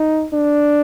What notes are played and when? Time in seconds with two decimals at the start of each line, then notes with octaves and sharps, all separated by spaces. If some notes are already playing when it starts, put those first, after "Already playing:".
Already playing: D#4
0.33 D4